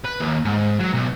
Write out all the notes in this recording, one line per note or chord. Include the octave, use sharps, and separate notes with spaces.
B4
D#2
G#2
F#3
B1